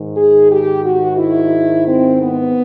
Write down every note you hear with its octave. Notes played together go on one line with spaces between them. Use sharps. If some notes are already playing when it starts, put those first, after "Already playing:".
Already playing: G#2 D#3
G#4
G4
F#4
E4
C4
B3